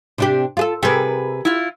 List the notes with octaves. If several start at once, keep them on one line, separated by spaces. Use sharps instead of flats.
C3 D4 G4
F4 G#4 A4
C3 G4 G#4 A#4 B4
E4 F4